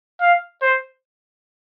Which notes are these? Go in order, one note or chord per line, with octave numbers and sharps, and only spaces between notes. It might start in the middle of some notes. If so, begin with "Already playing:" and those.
F5
C5